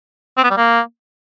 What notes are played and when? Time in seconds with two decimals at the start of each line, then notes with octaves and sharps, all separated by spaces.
0.37 C4
0.44 B3
0.50 G3
0.57 A#3